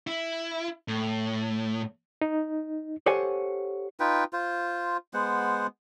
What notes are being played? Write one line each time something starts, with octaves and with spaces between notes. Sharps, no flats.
E4
A2
D#4
G4 A4 C5 C#5 F#5 G#5
D#4 F4 B4 G5
F4 C5
G#3 B3 C5 F#5